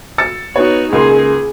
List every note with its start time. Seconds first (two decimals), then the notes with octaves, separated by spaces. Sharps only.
0.18 E6 A6 C#7
0.56 B3 D#4 F#4 C#5
0.93 C#2 A#3 G#4 C6